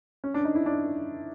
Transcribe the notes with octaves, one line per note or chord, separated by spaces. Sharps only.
C#4
D4
D#4
E4
D4